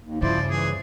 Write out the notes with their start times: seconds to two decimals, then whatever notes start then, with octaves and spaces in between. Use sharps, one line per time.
0.01 D#2
0.22 G2 C#3 F3 E4 C5 D5
0.50 E3 G#4